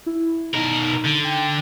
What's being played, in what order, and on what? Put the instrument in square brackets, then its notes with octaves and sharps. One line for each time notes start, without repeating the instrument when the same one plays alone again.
[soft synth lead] E4
[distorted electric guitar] B2 A#4 [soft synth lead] D#4
[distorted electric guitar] D3
[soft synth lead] G5